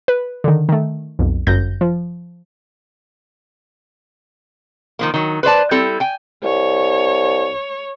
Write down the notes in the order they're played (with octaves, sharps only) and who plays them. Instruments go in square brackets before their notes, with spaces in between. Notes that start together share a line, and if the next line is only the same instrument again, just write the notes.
[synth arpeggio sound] B4
D3 D#3
D#3 A3
B1 F2
G1 F#2 G6 A#6
F3
[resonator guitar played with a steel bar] D#3 F3 A#3
D#3 F#3
B4 C5 D5 A5
G3 C4 E4 A4
G5 G#5
[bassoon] C2 [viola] C#5